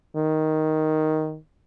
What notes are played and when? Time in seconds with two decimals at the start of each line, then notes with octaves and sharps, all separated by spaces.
0.17 D#3